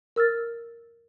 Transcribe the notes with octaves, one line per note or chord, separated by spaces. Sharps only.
A#4 E6 F6 A6